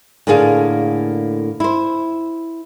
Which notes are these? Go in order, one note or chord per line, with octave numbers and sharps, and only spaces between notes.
A2 D3 A#3 G#4 F5
E4 C5